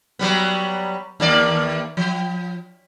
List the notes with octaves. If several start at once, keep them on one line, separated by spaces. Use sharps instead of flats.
F#3 G3 B3
D#2 A#3 D5
F3